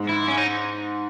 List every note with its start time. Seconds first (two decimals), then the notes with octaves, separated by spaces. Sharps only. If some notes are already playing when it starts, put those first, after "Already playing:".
Already playing: G#2
0.09 E4
0.28 C#4
0.37 D#4